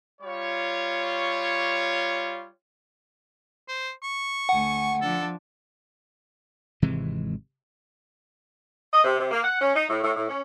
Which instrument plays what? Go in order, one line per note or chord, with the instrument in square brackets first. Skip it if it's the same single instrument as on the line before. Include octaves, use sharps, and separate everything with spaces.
[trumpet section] G3 F4 C#5
[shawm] C5
C#6
[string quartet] D2 G#5 [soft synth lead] F#5
[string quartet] F3 D4 [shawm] A4
[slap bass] G#1 C3 E3 G#3
[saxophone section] D#5
C3
C3
A#3
F#5
C#4
D#4
A2
A2
A2
C#4